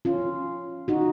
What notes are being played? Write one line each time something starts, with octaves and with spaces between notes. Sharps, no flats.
C#4 F4
D#4 F#4